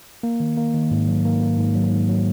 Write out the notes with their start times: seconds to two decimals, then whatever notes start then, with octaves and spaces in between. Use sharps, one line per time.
0.23 A#3
0.40 D#3
0.57 A#3
0.74 D#3
0.91 G#2
1.08 F#3
1.25 A#3
1.41 A#3
1.58 G#2
1.75 F#3
1.91 G#2
2.08 F#3